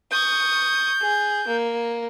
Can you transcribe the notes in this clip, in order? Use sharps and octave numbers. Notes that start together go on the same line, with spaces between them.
C#6 D#6 G6
G#4
A#3